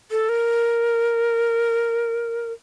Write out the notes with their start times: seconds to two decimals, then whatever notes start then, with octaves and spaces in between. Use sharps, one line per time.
0.11 A4
0.29 A#4